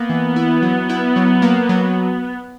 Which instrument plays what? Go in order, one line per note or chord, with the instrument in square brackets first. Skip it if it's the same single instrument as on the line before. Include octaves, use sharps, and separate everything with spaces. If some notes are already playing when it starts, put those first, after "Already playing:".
Already playing: [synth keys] A#3 [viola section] B3
[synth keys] E3
E4
F#3
E4
F#3
A#3
F#3